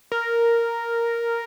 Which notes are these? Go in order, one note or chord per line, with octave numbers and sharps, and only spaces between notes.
A#4